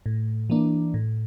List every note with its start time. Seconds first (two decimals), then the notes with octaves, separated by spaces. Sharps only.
0.06 A2
0.50 E3 A#3 D4
0.94 A2